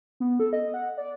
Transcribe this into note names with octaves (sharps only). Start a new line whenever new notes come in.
B3
A4
D#5
F#5
D5